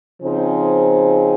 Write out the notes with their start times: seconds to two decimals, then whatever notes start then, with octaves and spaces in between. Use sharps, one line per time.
0.22 C#3 F3 C4 D#4 G#4